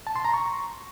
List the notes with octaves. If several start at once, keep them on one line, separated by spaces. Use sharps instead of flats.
A5
C6
A#5
C#6